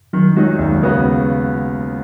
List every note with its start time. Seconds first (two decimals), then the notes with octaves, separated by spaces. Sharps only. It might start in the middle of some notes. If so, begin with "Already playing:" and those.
0.13 D#3 F#3
0.36 F#3 G#3 D#4 F#4
0.59 D#2
0.82 C#3 B3 F#4